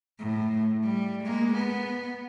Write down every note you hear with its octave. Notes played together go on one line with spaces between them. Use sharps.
A2
G3
G#3 A#3
B3